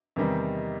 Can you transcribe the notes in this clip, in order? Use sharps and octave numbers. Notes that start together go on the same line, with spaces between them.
E2 C3 D#3 G3 D#4